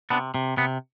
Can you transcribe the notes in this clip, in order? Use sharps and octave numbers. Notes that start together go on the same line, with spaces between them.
C3 B3 D4
C3
C3 B3